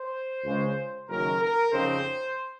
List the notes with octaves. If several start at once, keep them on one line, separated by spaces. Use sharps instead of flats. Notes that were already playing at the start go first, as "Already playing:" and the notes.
Already playing: C5
C#2 C#3 G#3 C#4
F#1 F#2 D#3 A#4
A#4
F2 C#3 F3 C4 D#4 C5